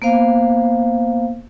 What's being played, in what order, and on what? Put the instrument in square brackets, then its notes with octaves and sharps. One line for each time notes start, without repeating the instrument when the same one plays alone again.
[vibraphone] A#3 B3 C5 F5